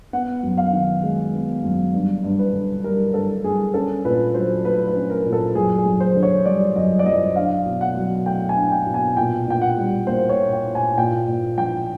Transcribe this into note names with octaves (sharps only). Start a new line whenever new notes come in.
B3 F#5
F#2
F5
D#3
G#3
B3
F#2
G2
G2
B4
D3
G3 A#4
G2 A4
G2 G#4
C#4 A4
A#2 B4
F#3 C5
A3 B4
B4
C#4
A#4
A#2
A4
F#2 G#4
G#4
F#2
C5
D3
C#5
G3 D5
F#2 D#5
D5
F#2 D#5
D4 F5
B2
F#5
F#3
A3 G5
G#5
D4
G5
B2
G#5
A#2 G5
A#2 G5
F#5
G3
A#3 C5
C#5
A#2
G5
A#2
G#5
A#2 G5
A#2
F3 G5